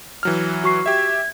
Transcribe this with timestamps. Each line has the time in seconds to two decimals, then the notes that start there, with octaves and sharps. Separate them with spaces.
0.23 E3 F#3 F6
0.64 F#4 C#6 C7
0.86 G4 E5 G#6